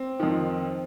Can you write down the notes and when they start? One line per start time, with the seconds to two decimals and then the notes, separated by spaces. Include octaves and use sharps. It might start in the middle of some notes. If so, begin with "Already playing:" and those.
Already playing: C4
0.19 F2 D#3